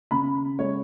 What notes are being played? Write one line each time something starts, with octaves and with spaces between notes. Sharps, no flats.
C#3 B5
G#3 C#5